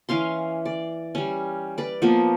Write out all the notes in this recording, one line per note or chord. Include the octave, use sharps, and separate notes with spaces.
E3 C#4 F5 C6
D5
G3 C#4
B4 D5
F3 A#3 B3